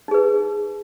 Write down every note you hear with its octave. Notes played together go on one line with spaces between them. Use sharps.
D#4 G#4 B4